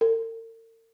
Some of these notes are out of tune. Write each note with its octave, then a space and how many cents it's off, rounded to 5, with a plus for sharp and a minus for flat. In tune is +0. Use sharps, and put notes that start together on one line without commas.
A#4 -45